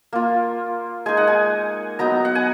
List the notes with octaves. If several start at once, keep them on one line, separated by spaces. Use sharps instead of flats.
A#3 F4
G#3 D#4 G#5
F#5
G#5
F#3 B3 D#4 A#5
F#5
G#5